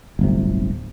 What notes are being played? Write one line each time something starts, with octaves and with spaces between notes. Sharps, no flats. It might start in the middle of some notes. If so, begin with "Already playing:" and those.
D1 G1 C3